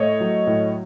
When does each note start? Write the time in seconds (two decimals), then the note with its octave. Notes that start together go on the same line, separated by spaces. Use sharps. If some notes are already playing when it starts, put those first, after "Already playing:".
Already playing: A2 A3 C#5 D#5
0.20 F#3
0.47 A2